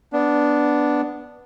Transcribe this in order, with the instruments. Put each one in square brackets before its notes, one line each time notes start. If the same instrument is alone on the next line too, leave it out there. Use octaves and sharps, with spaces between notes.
[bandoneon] B3 D4